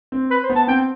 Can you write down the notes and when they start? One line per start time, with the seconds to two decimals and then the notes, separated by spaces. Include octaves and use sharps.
0.12 C4
0.31 B4
0.43 C5
0.50 B3
0.55 A5
0.68 C4 G5